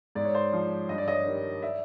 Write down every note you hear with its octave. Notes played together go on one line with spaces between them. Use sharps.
G#2 D5
C#5
C5 D5
F3
G2 D#5
D5
C#5 D#5
D#3 G3
D5 E5